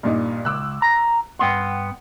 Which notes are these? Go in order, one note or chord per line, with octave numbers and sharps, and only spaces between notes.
G2 A#2 D#4
C#2 D6 E6 F#6
A#5
G2 B3 F#5 G5 C6